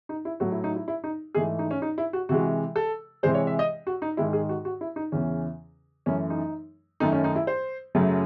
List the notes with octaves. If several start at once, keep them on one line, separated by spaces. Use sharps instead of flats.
D#4
E4
A2 F#3 A3 F#4
E4
D#4
E4
E4
D#4
G#2 E3 A3 G#4
D#4
C#4
D#4
E4
F#4
C3 E3 G#3 F#4
A4
C3 E3 G#3 C5
C#5
E5
D#5
F#4
D#4
G#2 D#3 G#3 E4
G#4
F#4
F#4
E4
D#4
E2 C#3 E3 C#4
F#2 E3 A3 C#4
D#4
F#2 D#3 A3 D#4
C#4
D#4
E4
C5
F#2 C#3 F#3 A3